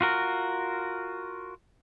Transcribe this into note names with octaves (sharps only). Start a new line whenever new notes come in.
F4 F#4 A#4